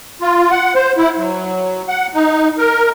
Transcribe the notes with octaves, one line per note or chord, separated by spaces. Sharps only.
F4
F#5
C5
E4
F#3
F#5
D#4
A#4